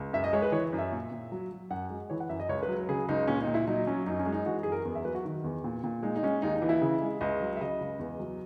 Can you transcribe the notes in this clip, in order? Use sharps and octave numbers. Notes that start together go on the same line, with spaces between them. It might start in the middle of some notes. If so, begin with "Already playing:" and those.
Already playing: C#2
F#2 E5
D#5
G#3 C#5
B4
E3 C#5
F#2
E5
A#2
A#2
F#3
F#3
F#2 F#5
G#3
E3 C#5
F#5
F#2 E5
D#5
C#2 C#5
B4
F#3
C#3 G#4
C#2 D#4
A#2 C#4
D#4
A#2
E4
F#3 D#4
F#3 C#4
F#2 D#4
C#4
G#3
D#4
E3 F#4
F#2 G#4
A#4
E2
E5
F#3 B4
F#4
D#3
E2
A#2
A#2
G#3 D#4
D#4
G#3 C#4
D#2 D#4
D#4
E3
E4
C#3
G#3
C#2 D#5
F#3
E5
C#3 D#5
C#2
E2
F#3